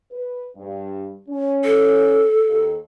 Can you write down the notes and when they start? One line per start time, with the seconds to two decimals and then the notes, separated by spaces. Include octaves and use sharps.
0.12 B4
0.57 G2
1.29 C#4
1.64 A4
2.47 D#2